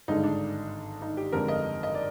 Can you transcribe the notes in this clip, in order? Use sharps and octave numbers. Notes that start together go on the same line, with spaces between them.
G#1 G2 D3 G#3 D#4
D4
D#4
G4
G1 F2 D3 G#3 A#4
D#5
D#5
D5